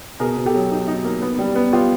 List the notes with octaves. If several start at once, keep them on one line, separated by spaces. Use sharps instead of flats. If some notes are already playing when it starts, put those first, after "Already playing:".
B2 G#4 A#4
B2
G4 A4
F#3
D#4
D#4
A#3
B3
G3
B3
B3 F4 G4